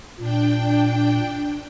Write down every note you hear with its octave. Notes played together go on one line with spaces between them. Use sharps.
A#2 D4 G5